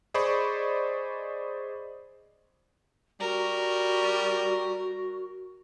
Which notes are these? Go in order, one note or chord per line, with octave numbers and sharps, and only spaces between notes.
G#4 C5 D5 D#5 B5 C#6
G3 F#4 A#4